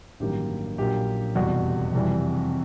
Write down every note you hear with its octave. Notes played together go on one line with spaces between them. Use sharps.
A1 G2 D#3 F#3 A#3 G4
A#1 A#2 F#3 A#3 G4
F1 E2 B2 G3 F#4
F2 C3 E3 G3